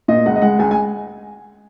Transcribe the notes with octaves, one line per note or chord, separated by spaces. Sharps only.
A#2 D#5
C#2 F#5
D#5
G#3 F#5
C#2 G#5
G#5